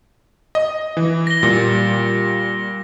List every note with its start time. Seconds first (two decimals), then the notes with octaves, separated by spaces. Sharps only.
0.55 D#5
0.97 E3
1.27 A#6 G7
1.43 A#2 G3